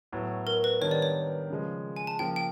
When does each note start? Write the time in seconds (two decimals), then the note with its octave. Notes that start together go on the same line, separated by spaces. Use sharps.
0.12 A2 F#3 B3
0.47 A#4
0.64 B4
0.81 D#3 G3 B3 D4 C#5
0.91 D5
1.02 C#5
1.50 C#3 F3 G#3
1.96 G#5
2.07 A5
2.19 C#3 F3 A#3 G5
2.36 G5